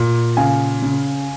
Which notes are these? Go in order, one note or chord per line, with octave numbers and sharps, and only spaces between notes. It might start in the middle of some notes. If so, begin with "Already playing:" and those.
Already playing: A#2
C#3 F5 G#5
C#3